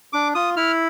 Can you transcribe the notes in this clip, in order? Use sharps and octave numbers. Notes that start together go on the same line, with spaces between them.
D4 D6
F4 D#6
E4 F6